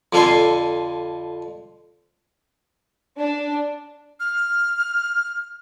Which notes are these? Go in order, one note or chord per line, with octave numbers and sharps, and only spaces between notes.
F2 D3 F4 A4 G#5 C6
D4
F6